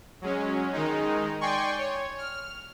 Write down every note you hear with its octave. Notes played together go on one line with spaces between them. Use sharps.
F#3 G#3 C#4
D#3 G#3 D#4
D5 G5 G#5 C6 C#6
C#5
F6